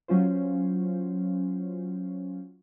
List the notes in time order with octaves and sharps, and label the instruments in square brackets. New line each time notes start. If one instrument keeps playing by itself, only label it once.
[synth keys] F#3 C#4 F4 C5